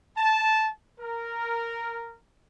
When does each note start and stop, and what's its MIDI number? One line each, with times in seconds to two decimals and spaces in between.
0.17 0.67 81
1.00 2.15 70